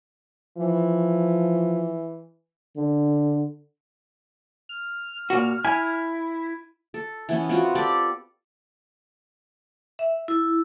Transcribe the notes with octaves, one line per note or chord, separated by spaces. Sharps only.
E3 F3
D3
F6
A#2 F#4
E4 G#5
A4
E3 B3 C#4
B3 C4 F4 F#4
G4 A4 D5 D6
E5
E4